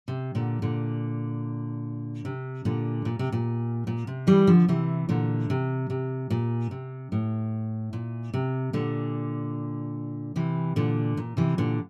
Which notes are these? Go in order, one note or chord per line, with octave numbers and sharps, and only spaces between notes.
C3
A#2 D3
A#2 D3
C3
A#2 D3
A#2
C3
A#2
A#2
C3
E3 G3
D3 F3
C3 E3
A#2 D3
C3
C3
A#2
C3
A2
A#2
C3
A#2 D3
C3 E3
A#2 D3
A#2
C3 E3
A#2 D3